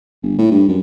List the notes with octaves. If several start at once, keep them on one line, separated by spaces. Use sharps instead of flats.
G1
A2
G2
F#2